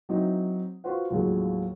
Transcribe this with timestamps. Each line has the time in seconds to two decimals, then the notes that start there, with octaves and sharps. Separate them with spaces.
0.09 F#3 C4 D#4 E4
0.84 F4 F#4 B4 C5 F#5
1.10 D#2 A2 F3 F#3 G#3